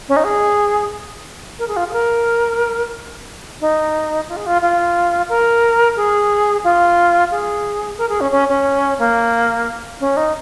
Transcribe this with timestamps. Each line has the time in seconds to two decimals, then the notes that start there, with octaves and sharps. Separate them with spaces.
0.09 C#4
0.16 D#4
0.24 G#4
1.59 A#4
1.68 G#4
1.77 F4
1.89 G#4
1.93 A#4
3.61 D#4
4.28 F4
4.36 G#4
4.46 F4
4.62 F4
5.29 A#4
5.96 G#4
6.64 F4
7.31 G#4
7.98 A#4
8.09 G#4
8.21 C#4
8.32 C#4
8.48 C#4
8.99 A#3
10.00 C#4
10.17 D#4